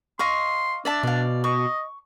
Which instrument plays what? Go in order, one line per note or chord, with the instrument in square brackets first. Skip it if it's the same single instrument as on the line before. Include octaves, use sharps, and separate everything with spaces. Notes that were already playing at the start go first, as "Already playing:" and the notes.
[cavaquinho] D#5 F5 C#6 [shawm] C6
[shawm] D4 [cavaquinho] D5 E5 A5
[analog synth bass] B2 [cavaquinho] D5 F5
[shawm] D#5 [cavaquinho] C#6